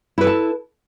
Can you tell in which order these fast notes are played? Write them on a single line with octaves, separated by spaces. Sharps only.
E4 B4 A4 A5